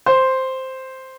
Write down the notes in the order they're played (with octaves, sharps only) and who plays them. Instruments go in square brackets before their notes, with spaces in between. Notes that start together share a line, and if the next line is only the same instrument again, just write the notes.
[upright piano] C5